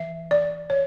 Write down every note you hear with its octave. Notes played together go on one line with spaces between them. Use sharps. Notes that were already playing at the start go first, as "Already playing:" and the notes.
Already playing: E3 E5
D5
C#5